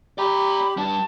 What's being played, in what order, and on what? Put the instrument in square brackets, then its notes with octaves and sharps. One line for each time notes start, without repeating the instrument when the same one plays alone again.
[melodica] G4 [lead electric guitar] D5 A#5 [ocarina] B5
[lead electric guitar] G3 D4 [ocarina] A5